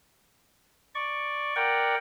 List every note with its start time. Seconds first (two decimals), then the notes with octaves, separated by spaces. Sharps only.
0.95 D5 C#6
1.56 A#4 D5 F#5 G5